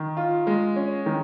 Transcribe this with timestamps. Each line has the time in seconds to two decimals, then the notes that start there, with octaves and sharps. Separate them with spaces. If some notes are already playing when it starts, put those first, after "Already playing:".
Already playing: D#3
0.17 F4
0.47 G#3
0.76 C#4
1.06 D#3